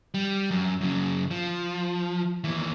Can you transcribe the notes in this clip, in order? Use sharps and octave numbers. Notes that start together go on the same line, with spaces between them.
G3
F#2
F#2 C#3
F3
D#2 E3